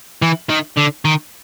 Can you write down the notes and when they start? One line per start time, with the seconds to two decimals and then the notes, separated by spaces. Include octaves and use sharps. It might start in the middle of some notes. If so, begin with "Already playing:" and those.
0.22 E3
0.50 D#3
0.77 D3
1.05 D#3